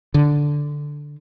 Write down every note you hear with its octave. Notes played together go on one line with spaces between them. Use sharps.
D3